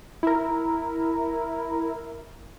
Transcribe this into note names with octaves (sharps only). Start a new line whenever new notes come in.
E4 A#4